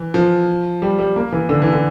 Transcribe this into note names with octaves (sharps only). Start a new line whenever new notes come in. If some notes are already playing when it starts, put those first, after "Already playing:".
Already playing: E3
F3
G3
G3
A#3
E3
D3
E3
D3